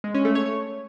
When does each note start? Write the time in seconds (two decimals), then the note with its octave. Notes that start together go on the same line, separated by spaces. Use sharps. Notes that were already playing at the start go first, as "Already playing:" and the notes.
0.04 G#3
0.14 C#4
0.25 A3
0.35 C#5
0.46 C#5